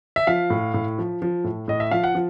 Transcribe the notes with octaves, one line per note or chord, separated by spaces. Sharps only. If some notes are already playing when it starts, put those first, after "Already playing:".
E5
F3 F5
A2
A2
F3
F3
A2
A2 D#5
E5
F3 F5
F#5
F3